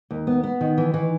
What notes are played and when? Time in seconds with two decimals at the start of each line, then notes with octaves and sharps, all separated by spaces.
0.11 D#2
0.27 B3
0.43 B3
0.61 D#3
0.78 E3
0.94 E3